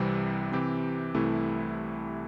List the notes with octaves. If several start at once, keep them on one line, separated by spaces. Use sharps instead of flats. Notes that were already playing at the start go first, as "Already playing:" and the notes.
Already playing: C2 C3 E3 G3 C4
C3 E3 C4 G4
C2 C3 E3 A3 E4